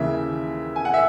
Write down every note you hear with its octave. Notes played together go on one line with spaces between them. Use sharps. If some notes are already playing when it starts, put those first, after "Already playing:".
Already playing: D#2 C#3 E3 E5
G#5
F#5
E5